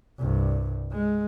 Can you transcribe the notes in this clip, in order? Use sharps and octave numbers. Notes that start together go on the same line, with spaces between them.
C2 G2
G#3